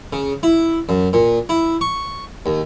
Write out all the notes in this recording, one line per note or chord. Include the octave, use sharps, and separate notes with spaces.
C#3
E4
F#2
A#2
E4
C#6
D#2